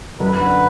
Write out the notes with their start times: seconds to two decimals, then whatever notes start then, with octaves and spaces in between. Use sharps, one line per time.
0.20 F#2 B4
0.40 D3